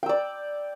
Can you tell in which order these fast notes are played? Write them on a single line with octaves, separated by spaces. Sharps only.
G5 E6 D5